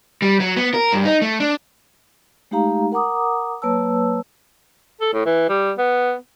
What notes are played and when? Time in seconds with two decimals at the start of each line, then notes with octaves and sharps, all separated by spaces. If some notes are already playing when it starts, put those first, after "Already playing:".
0.22 G3
0.40 F#3
0.56 B3
0.74 A#4
0.93 G2
1.05 D#4
1.22 A3
1.40 D4
2.51 G#3 A3 D#4 G4 F5 A#5
2.92 A#4 F#5 A#5 D6 D#6
3.62 F#3 A#3 B4 C#5 A5 E6
5.01 A4
5.13 A2
5.26 E3
5.49 G3
5.78 B3